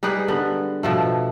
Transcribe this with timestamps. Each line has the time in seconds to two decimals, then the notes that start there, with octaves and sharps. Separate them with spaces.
0.03 G3 D#4 G#4 B4
0.28 D3 B3
0.83 B2 F3 A3